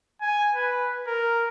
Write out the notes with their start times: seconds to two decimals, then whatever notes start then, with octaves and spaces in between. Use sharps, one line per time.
0.21 G#5
0.55 B4
1.07 A#4